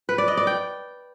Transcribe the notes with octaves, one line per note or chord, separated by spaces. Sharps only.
B4
D5
D#5
D5
G5